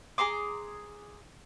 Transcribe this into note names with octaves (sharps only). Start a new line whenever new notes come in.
G#4 A#5 C6 D6